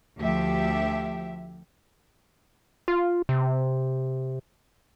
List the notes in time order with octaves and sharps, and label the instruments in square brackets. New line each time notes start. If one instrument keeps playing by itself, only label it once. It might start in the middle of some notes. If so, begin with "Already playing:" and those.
[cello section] D2 F3 G4 E5
[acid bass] F4
C3